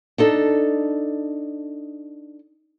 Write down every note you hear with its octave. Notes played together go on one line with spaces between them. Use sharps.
D4 D#4 A4